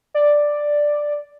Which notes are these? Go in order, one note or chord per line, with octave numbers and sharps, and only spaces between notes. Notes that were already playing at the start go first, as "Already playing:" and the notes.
D5